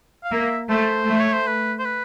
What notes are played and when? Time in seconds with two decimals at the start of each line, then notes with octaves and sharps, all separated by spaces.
0.24 F5
0.31 A#3 E5
0.70 A3 C5
1.08 A3
1.20 C#5
1.33 C5
1.46 B4
1.79 C5
1.85 B4